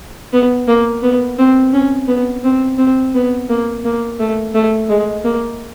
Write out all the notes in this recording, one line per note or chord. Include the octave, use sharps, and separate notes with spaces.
B3
A#3
B3
C4
C#4
B3
C4
C4
B3
A#3
A#3
A3
A3
G#3
A#3